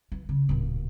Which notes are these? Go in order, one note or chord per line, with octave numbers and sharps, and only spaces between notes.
E3
C#3
D1 A#2